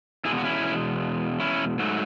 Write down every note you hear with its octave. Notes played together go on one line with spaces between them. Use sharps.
E2 B2 G#3 E4 G#4
F#4
C#4 E4
C#4 E4
G#2 F#3 A3